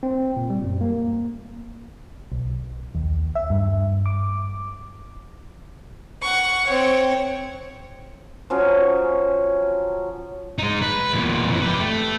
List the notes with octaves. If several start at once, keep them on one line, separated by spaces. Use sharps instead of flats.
C4
A#2
G3
F#2
A#3
B1
D#2
E5
G2
D6
F#5 C#6
C4 C#5
F3 F#3 C#4
G#3 D#4
B4
E2 A#2
F2 E3
G4 B4
A3